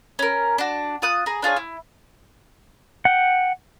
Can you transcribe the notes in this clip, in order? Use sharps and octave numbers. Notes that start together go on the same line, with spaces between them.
C#4 A#4
D4 F#4
F4 D#6 F#6
G#4 A#5
D4 F4 G#4 C#5
E4
F#5 G5